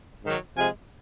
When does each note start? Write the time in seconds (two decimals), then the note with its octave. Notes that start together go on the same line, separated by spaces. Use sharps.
0.23 G#2 D#3 F#3
0.57 C3 F3 G#3 G#5